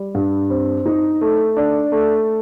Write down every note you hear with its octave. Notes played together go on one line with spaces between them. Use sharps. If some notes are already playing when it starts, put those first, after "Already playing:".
Already playing: G3
G2
C4
D#4
A3
D4
A3